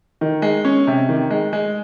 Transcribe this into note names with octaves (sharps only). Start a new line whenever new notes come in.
D#3
G#3
C#4
C3
D#3
G#3
G#3